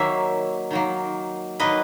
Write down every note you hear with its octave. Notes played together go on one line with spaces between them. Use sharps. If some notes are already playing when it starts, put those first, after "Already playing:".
Already playing: D#3 F#3 A#3 C#5 E5
D#3 F#3 A#3
D#3 F#3 A#3 B4 D#5